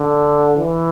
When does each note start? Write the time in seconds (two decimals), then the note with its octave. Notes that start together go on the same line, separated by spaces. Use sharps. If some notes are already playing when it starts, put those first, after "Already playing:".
Already playing: D3
0.57 E3